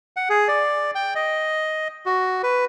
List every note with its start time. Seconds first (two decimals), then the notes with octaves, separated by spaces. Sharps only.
0.17 F#5
0.30 G#4
0.48 D5
0.95 G5
1.15 D#5
2.06 F#4
2.43 B4